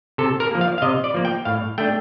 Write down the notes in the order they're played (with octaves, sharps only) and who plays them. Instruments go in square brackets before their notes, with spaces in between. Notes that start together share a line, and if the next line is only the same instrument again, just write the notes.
[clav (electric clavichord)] C3 A4
A#4
F3 A#3
F5
F5
C3 D#5
D5
F3 A#3
G5
A2 F5
A3 D4 G5